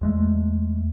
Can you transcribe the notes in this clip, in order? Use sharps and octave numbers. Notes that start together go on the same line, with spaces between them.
E2 G#3 A3